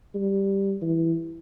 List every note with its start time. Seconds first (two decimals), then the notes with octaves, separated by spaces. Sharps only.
0.14 G3
0.82 E3